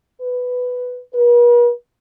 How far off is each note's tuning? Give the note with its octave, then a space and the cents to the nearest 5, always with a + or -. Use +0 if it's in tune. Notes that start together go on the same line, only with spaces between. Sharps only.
B4 +5
B4 -45